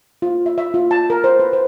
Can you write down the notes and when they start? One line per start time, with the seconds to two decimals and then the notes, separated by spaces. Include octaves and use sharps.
0.22 F4
0.46 E5
0.58 E5
0.74 F4
0.91 A5
1.10 A#4
1.24 C5
1.40 B4
1.53 C5